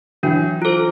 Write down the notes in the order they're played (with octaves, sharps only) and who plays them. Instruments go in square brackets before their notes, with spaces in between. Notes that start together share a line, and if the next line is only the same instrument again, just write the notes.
[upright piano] E3 F#3 [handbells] D4
[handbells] F4 A4 C5